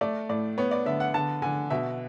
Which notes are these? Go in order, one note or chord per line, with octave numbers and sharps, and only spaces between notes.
A3 D5
A2 D5
B3 C#5
D5
D3 E5
F#5
D3 A5
D3 G#5
B2 E5